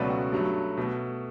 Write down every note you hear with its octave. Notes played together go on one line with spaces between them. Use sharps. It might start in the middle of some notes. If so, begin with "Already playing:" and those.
Already playing: C#2 B2 F#3 A3 B4 D5
F#4
G2 F#3 A3
B2 A3